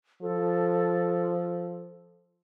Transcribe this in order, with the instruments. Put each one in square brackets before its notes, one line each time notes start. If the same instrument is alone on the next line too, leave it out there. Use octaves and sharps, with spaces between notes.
[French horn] F3 [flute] A4